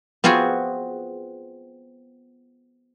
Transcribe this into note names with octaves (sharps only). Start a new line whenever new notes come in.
B3 C4 F4 F#4 G#4